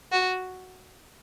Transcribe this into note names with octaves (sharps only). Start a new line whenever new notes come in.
F#4